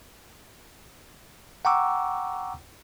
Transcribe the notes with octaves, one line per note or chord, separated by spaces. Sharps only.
F#5 G5 A#5 C#6 D6 E6